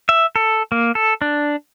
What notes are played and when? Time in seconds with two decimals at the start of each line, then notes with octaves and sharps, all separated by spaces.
0.09 E5
0.36 A4
0.72 A#3
0.95 A4
1.22 D4